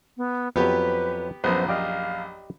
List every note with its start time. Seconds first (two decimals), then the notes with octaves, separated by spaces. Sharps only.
0.17 B3
0.56 F2 F#3 B3 G4 B4
1.44 A#1 F#2 B3 B4 C5
1.68 G4 D5 D#5 F5